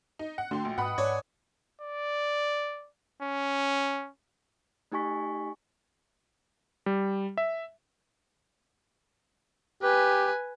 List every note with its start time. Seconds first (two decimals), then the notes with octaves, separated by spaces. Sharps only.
0.19 D#4
0.38 F#5
0.51 D3 A3 F#4 G5 C6
0.65 A#1
0.78 G#2 B4 D#5 F#5 B5 D#6
0.98 G#2 D4 C#5 G#5
1.81 D5
3.23 C#4
4.92 A3 D#4 G4 G#5 C#6 B6
6.86 G3
7.37 E5
9.82 G4 B4 G#5